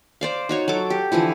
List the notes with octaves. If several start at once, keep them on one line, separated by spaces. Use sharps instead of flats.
C5 D5 F5
D#4 F#4 C#5
F#3 A4 D6
G4
D3 E3 F3 E4